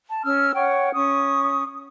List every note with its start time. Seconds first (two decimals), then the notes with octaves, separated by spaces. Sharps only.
0.11 A5
0.24 C#4 E6 F6
0.55 C#5 F#5 G5 C#6
0.94 C#4 C#6 D#6